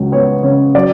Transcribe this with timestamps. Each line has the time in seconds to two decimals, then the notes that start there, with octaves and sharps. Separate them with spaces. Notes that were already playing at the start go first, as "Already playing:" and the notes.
Already playing: C#2 F#3
0.12 B3 C#5
0.43 C#3 C#5
0.75 F#3 D5